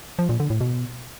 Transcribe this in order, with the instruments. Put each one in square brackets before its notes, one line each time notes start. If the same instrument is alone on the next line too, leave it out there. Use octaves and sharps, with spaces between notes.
[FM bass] F3
A#2
D3
A2
B2